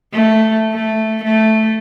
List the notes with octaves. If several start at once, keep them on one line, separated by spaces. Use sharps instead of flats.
A3
A3
A3